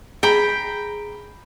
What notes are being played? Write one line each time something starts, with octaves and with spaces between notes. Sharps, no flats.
G#4 G5 A#5 B5